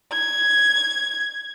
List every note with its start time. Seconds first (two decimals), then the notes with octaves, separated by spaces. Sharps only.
0.12 G#6